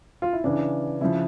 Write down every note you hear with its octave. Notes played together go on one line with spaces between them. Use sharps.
F4
E4
C#3 E3 D4
C#3 F3 E4